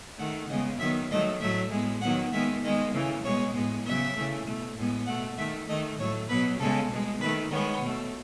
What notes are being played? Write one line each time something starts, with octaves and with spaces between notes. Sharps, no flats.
D#3 A3 F#5
C#3 G#3 B3 D#5
D#3 F#3 B3 E5
D#3 F#3 A3 D#5
A2 F#3 A3 E5
A2 G#3 B3
D#3 F#3 B3 F#5
D#3 G#3 B3 E5
D#3 G#3 B3 D#5
C#3 E3 A3
B2 G#3 B3 C#5
A2 G#3 B3
C#3 F#3 B3 E5
C#3 E3 A3
B2 A3
A2 G#3 B3
B2 A3 F#5
D#3 A3 E5
D#3 A3 D#5
A2 F#3 A3 C#5
B2 F#3 B3 B4
C#3 G#3 B3 A4
B2 G#3 B3
D#3 A3 B4
D#3 G#3 B3 C#5
B2
A3